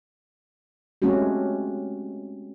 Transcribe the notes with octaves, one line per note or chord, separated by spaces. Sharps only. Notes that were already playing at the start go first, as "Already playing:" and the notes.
G#3 A3 C4 C#4 F#4 G4